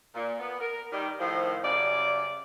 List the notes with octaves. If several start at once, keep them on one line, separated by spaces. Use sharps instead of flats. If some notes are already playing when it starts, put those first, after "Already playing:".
A#2
B3
A#4
D#3 G3
A2 D#3 F3
F#2 C#3 G3 D5